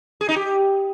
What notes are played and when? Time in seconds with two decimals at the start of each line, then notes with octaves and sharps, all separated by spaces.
0.21 G#4
0.29 D#4
0.36 G4